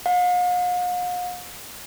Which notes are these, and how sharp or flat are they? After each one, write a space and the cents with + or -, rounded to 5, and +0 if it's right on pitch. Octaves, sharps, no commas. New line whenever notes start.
F5 +45